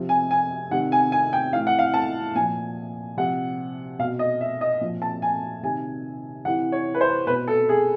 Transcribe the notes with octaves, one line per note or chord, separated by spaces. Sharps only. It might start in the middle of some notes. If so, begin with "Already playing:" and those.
Already playing: C3 F3
G#5
G#5
C3 D#3 F#5
G#5
G#5
G5
A2 E3 F5
F#5
F5
A5
A#2 F3 G#5
C3 F3 F#5
B2 F5
D#5
E5
D#5
A#2 F3
A5
G#5
C3 D#3 G#5
C3 E3 F#5
C#5
B4
C5
B2 B4
A4
G#4